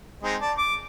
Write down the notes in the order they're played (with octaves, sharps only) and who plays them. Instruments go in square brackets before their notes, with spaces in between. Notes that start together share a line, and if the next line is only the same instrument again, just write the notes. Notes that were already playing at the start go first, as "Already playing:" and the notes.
[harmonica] G#3 C4 D#4
D5 A5
D6